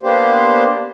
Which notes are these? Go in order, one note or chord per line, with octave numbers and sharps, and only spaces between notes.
A#3 B3 D4 G4 C5